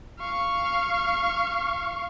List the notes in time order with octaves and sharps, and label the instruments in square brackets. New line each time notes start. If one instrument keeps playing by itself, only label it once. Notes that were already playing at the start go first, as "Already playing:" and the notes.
[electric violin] F5 C#6